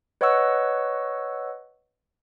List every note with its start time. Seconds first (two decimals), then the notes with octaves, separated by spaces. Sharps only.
0.21 B4 C#5 D#5 F#5 C#6 E6